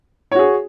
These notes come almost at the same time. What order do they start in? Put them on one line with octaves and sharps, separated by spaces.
C#5 F#4 G#4